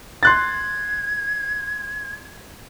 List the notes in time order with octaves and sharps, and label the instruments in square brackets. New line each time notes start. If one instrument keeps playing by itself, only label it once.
[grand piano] C6 F#6 A6 [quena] G#6